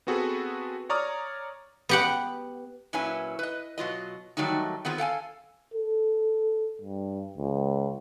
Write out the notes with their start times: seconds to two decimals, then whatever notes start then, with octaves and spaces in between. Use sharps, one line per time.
0.07 B3 C4 F#4 G#4 A4 B4
0.89 C#5 D5 A#5 C#6 D#6 F6
1.89 B3 G4 F#5
2.93 A#2 F#3 C#4 E4 B4 G#5
3.39 B4 D#5
3.78 B2 F#3 F4 D#5
4.37 D#3 F#3 G3 A3 D#4
4.85 D#3 B3 C4 F4 G#4
4.98 A4 F5 G5 G#5
5.74 A4
6.82 G2
7.38 C#2